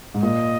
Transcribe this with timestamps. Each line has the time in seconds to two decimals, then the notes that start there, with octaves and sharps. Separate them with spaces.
0.14 G#2
0.23 A#2 D#5